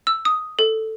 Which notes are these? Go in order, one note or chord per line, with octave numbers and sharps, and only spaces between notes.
E6
D#6
A4